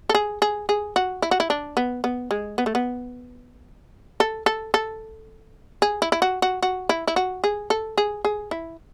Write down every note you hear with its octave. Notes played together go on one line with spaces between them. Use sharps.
A4
G#4
G#4
G#4
F#4
E4
F#4
E4
D4
B3
B3
G#3
B3
A3
B3
A4
A4
A4
G#4
E4
E4
F#4
F#4
F#4
E4
E4
F#4
G#4
A4
G#4
G#4
E4